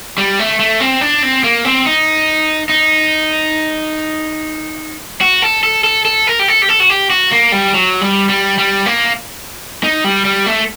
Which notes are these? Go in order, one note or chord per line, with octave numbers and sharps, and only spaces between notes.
G3
A3
A3
C4
D4
C4
A#3
C4
D#4
D#4
F#4
A4
A4
A4
A4
A#4
G4
A4
G4
A4
F#4
G4
F#4
A#3
G3
F#3
G3
G3
G3
A#3
D#4
G3
G3
A3